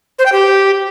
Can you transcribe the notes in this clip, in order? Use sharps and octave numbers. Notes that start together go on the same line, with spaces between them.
C5
G5
G4